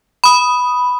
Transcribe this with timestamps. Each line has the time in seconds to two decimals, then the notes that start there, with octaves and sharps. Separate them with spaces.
0.24 B5 D#6